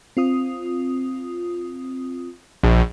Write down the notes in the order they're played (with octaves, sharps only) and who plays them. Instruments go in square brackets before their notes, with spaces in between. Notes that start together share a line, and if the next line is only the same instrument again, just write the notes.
[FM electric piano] C4 F4 D#6
[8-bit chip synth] A#1